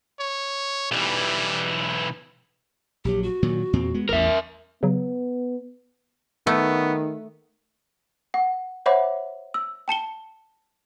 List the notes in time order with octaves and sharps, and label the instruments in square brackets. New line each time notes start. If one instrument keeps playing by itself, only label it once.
[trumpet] C#5
[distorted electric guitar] B1 E3 [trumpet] G3
[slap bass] A#1 F#3 [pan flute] G4
[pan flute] F#4
[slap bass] A#2 D#3 F#3
E2 A#2 C4
G#3 B3
[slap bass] A1 E2 [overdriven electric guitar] A#4 E5
[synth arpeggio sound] C#3 F#3 [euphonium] B3
[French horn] D#3 [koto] A3 [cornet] B3
[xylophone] F#5
C5 C#5 E5 F#5 B5 D6
E6
G5 A5 C#7 G7